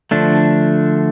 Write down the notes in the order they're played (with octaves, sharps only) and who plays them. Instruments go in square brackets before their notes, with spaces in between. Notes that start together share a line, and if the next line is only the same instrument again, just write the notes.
[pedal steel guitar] D3 F3 A3 D4